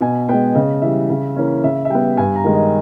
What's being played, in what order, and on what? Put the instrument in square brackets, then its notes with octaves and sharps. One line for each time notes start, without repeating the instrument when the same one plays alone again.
[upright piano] B2 G#5
G#3 B3 G5
C#3 D#5
E3 G3 E5
C#3
E3 A#3 C#4
C#3 E5
E5
G3 B3 G5
G2 G#5
A#5
D#3 G#3
D#5